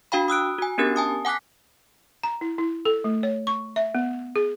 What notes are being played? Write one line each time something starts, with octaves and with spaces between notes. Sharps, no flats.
D4 F#4 F5 G5 B5
D#6 E6 F#6 D7
F#4 G#5
B3 C#4 D4 G4 A#4 A6
G#5 A5 D#6
F#5 G#5 D6 F#6 B6
A#5
E4
E4
A4
A3
C#5
C#6
E5
B3
G#4